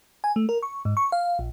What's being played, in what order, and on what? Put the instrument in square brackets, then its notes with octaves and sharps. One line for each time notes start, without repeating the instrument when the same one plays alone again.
[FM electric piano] G#5
A3
A#4
C#6
G#2
C#6
F5
A#1